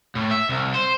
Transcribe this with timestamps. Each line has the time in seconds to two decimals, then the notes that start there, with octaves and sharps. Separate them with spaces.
0.15 A2
0.31 E5
0.49 C2
0.74 C5